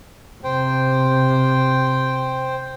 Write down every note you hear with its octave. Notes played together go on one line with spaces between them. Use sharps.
C3 C5 G5